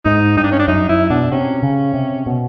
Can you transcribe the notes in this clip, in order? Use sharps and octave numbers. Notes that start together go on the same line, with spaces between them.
G#2 D#4
G2 D#4
D4
C#4
D4
F#2 D#4
F#2 E4
B2 D4
C3 C#4
C#3
C3
B2